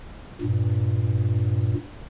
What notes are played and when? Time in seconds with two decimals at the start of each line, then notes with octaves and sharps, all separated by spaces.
0.41 G2 A#2